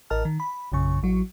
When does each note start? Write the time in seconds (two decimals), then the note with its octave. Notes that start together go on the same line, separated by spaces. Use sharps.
0.10 A1 A#4 D#5 A5 F6
0.25 D#3
0.40 B5
0.72 A#1 F#2 C#3 C#6
1.03 A1 F#3 F#4